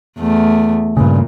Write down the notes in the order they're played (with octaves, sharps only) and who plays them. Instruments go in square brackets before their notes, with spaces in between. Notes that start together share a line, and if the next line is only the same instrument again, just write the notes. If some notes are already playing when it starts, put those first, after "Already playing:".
[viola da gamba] E2 A3
[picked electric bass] G2 C#3 [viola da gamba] A#2